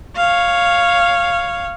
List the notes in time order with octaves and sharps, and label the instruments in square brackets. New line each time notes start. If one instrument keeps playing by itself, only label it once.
[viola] C#5 F5